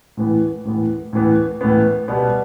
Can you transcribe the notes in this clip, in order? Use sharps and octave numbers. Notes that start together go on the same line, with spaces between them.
A2 E3 B3
A2 E3 B3
A2 E3 B3
A2 E3 B3
B2 G3 B3